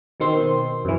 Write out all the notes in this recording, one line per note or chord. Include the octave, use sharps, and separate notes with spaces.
B2 D#3 C4 C6
F#2 E3